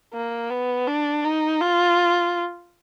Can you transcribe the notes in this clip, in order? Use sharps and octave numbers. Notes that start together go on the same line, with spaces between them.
A#3
B3
D4
D#4
F4